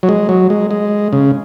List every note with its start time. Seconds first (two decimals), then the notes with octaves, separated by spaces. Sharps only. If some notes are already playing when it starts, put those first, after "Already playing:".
0.03 F#3
0.09 G#3
0.29 F#3
0.50 G#3
0.71 G#3
1.13 C#3